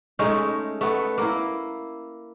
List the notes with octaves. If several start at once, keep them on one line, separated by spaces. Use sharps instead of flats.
G#3 A3 C#4 D#4
A3 B3
A#3 E4